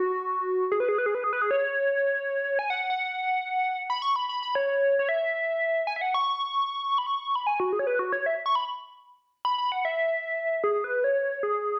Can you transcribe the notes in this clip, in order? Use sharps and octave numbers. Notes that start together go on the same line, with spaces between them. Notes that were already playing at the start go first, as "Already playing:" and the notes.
Already playing: F#4
G#4
B4
G#4
B4
G#4
B4
G#4
B4
G#4
C#5
G#5
F#5
F#5
B5
C#6
B5
B5
B5
C#5
C#5
E5
G#5
E5
F#5
C#6
B5
C#6
B5
G#5
F#4
G#4
C#5
B4
F#4
C#5
E5
C#6
B5
B5
B5
F#5
E5
G#4
B4
C#5
G#4